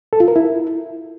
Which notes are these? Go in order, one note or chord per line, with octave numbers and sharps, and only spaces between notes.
A4
F4
A#4
E4